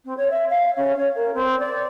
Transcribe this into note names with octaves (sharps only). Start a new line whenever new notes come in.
C4
C#5
E5
F5
C#4
C#5
A#4
C4
D5